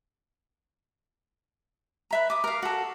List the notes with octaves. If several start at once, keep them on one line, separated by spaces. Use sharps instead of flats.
B4 E5 A#5
D6 D#6
A#4 F5
F#4 A4